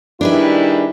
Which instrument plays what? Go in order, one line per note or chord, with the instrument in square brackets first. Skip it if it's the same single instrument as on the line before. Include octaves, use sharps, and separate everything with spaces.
[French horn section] D#3 G3 E4 [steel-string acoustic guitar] D4 G#4 B4